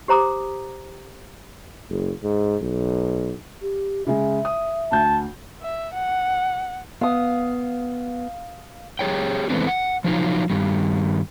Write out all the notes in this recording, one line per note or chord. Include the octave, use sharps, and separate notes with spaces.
G4 C5 A#5 D6 D#6
F#1
G#2
B1
G4
C#3 G#3 E5
D#6
D2 A5 G6
E5
F#5
B3 F5 D#6
G4 G#4 C#5 G5
E3 G#3 A3 B3 C4 D4
F#5
F3 F#3 D#4 F4
G2 D#3 G3